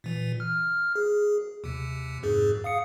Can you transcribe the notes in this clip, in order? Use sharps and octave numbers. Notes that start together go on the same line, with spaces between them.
A#2 E3
F6
G#4
D#2 C3
F2 G#2 G#4
F5 D#6 C#7